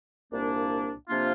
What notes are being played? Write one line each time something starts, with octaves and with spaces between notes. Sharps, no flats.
C2 A#2 A#3 D4
C3 F3 A#3 D4 F4